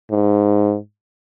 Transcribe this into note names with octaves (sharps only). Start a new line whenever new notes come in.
G#2